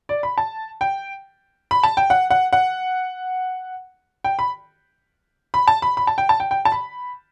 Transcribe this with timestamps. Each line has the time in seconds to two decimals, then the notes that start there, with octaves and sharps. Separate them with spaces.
0.09 D5
0.23 B5
0.38 A5
0.81 G5
1.71 B5
1.83 A5
1.97 G5
2.10 F#5
2.30 F#5
2.53 F#5
4.24 G5
4.39 B5
5.54 B5
5.68 A5
5.82 B5
5.97 B5
6.07 A5
6.18 G5
6.29 A5
6.40 G5
6.51 G5
6.65 A5
6.72 B5